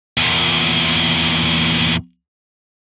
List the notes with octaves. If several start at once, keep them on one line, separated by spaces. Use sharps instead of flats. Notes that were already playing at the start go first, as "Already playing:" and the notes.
E2 A#2